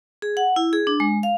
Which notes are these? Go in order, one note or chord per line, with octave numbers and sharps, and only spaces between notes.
G#4
F#5
E4
G#4
D4
G#3
F5